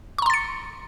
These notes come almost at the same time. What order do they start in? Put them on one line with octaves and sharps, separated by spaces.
C#6 A#5 C6 A6 C#7